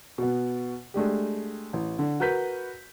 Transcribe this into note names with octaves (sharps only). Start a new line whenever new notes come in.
B2 B3
G#3 A3 D4 G4
A1
D3
F#4 A#4 B4 G6 B6